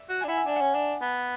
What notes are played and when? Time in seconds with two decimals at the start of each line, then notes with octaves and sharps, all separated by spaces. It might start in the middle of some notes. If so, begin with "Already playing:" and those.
Already playing: D5 E5
0.09 F#4
0.21 D4 G#5
0.28 E4 F#5
0.37 E5
0.46 D4 G#5
0.56 C#4 F#5
0.75 D4
1.01 B3